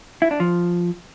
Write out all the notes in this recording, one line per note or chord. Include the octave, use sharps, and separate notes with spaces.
E4
D4
F3